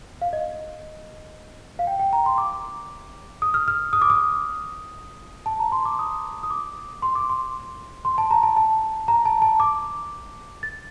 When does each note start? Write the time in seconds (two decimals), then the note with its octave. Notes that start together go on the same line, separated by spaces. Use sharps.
0.22 F5
0.33 D#5
1.79 F5
1.87 G5
2.00 G5
2.13 A#5
2.26 C6
2.38 D6
3.42 D#6
3.54 F6
3.68 F6
3.93 D#6
4.02 D6
4.10 D#6
5.46 A5
5.59 A#5
5.72 C6
5.85 D6
5.99 D#6
6.43 D#6
6.50 D6
7.02 C6
7.15 D6
7.30 C6
8.05 C6
8.18 A5
8.31 A#5
8.43 A5
8.57 A5
9.08 A#5
9.25 A5
9.42 A5
9.60 D6
10.63 A6